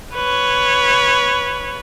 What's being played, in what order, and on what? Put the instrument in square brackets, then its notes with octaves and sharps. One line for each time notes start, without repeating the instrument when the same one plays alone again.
[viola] B4 C#5